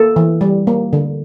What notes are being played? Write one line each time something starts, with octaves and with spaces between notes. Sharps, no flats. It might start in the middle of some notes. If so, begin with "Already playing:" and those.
Already playing: A#3 A4
E3
G3
A#3
D3